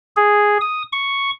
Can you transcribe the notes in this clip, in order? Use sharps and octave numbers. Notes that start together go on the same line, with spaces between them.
G#4
D#6
C#6